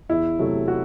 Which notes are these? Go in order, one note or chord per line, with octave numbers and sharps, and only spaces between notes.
E2 E4
C3 F#3 A3
F#4